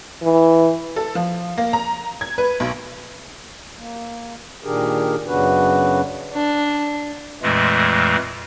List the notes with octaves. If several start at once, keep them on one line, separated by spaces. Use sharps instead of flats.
E3
A4
F3
A#3
A#5
G#6
B4
B1
A#3
A#2 D#3 D4 G4 G#4 A#4
F#2 C#3 B3 D4 F#4 B4
D4
F2 A#2 E3 G#3 A3